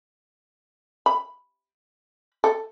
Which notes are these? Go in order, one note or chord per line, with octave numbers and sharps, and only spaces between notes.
B5
A4